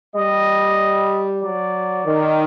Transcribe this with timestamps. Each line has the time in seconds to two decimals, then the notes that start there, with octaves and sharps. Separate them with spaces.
0.15 G3 D#5
1.42 F#3 D5
2.04 D#3